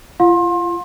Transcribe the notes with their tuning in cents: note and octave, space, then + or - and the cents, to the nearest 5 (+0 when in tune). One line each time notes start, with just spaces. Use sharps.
F4 -35 F5 +40 C6 +25